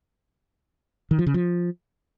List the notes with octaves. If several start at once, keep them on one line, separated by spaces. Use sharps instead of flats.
D#3
F3
C#3
F3